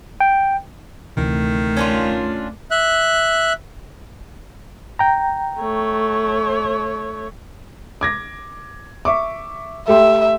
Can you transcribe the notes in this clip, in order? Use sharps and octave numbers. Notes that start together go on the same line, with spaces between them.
G5
D2 C3 D#3 E3 A3
C#4 D4 F4
E5 F#6
G5 A#5
A3 C#5
D6 G#6 A#6
E5 C#6 D6
A3 G4 E5 C6